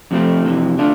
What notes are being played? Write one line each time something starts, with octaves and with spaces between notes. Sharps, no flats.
F2 C3 F3 A3 C4
F2 C3 E3
D3 A3 D4 F4